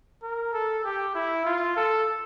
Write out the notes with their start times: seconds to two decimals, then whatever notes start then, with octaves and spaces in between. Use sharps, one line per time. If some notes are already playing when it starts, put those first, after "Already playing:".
0.22 A#4
0.53 A4
0.84 G4
1.15 E4
1.45 F4
1.77 A4